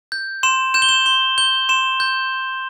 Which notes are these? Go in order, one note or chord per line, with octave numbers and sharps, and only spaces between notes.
G6
C6 E7
G6 E7
G7
E7
C6 G7
G6 G7
C6 E7
G6